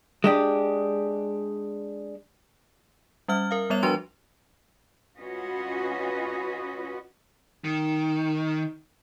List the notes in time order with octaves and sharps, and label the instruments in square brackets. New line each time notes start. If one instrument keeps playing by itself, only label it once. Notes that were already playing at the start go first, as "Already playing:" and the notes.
[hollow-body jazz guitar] G#3 D4 G4
[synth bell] G3 C#4 E5 F6
A#4 F5
G3 B3 C#5 E5 F7
F3 D4 F#4 B4 C6 F7
[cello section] C#4 F4 F#4 B4 D#5
[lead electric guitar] D#3